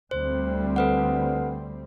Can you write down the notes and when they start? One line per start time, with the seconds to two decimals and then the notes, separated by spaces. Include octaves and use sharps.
0.11 D2 G3 C4 C5
0.76 A4 B4 F#5